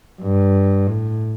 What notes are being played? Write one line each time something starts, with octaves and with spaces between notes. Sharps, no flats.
G2
A2